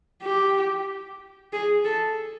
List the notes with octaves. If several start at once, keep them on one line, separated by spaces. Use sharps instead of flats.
G4
G#4
A4